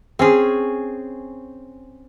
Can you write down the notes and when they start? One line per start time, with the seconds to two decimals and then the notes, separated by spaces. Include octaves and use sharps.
0.19 C4 C#4 G#4